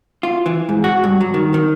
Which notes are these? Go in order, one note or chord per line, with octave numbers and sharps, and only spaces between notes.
F4
E3
G#2
F#4
G2
F#3
D#3
D#3